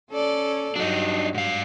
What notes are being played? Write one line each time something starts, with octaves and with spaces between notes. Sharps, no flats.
C#4 A4 D5
G2 F#3 D4 D#4
G#2 F5